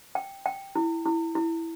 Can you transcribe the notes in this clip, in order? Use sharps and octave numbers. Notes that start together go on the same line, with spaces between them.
G5
G5
E4
E4
E4